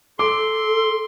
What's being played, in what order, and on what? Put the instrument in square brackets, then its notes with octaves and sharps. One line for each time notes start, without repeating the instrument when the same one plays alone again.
[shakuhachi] A4 [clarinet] C6 [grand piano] D6